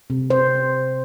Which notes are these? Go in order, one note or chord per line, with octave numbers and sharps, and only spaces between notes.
C3
C3 C5